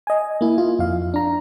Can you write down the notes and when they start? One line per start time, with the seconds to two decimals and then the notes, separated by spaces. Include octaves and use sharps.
0.07 D#5 G#5
0.41 A#3 E4
0.58 F4
0.79 F2 F5
1.14 D4 A#5